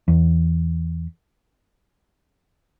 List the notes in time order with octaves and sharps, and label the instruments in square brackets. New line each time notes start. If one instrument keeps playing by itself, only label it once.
[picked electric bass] E2